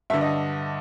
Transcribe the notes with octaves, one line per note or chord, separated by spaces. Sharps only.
G2 D3 E5
D#5